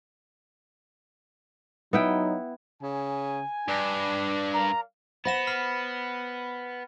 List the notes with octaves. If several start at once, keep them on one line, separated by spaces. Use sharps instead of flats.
F#3 B3 D#4 E4 G5
C#3 G#5
G2 D4
A#4 D5 F5 A#5
B3 C5 F#5 B5 A#6 E7
B5 F6 C7